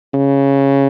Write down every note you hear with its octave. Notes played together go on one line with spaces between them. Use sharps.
C#3